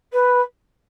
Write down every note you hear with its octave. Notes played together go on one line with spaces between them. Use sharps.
B4